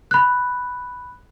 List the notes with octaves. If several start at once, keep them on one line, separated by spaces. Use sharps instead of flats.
B5 F#6